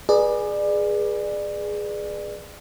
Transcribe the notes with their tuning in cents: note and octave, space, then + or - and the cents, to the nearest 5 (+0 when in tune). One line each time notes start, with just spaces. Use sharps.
G#4 +0 B4 -25 D5 +25